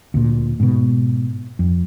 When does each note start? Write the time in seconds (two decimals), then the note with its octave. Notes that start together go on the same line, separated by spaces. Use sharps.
0.14 D2 A#2
0.60 G#2 B2
1.59 F2